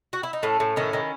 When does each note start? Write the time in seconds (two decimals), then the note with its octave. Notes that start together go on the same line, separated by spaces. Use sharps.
0.13 F#4
0.23 E4
0.33 D#4
0.42 A2 A3 C#4
0.60 A2
0.76 D#3 C#4 E4
0.93 D#3